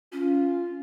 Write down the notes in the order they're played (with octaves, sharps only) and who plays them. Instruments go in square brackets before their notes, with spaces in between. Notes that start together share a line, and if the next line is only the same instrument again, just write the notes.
[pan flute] C#4 [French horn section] F4